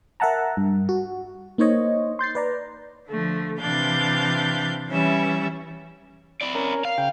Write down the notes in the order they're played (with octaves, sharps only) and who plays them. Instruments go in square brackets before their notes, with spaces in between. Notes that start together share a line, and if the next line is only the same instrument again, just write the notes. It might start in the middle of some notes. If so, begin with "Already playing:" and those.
[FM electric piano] A#4 E5 F#5 A5 A#5
G2
F#4
A#3 D#4 C5 C#5 D#5
C6 G6 A6 C7
B4 D5 A#5
[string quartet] D3 F3 A3
C3 E3 D4 F5 G6
E3 G3 C#4 E5
[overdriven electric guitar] E4 D5
[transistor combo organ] C#4 A#4
[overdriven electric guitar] F5
[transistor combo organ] C#3 G5